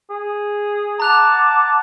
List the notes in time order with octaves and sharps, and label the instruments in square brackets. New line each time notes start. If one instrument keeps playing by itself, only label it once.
[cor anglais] G#4
[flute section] F#5 D6 [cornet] A5 [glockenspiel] A#5 F#6 F7